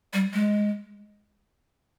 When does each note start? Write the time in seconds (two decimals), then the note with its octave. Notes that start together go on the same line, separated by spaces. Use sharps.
0.14 G3
0.33 G#3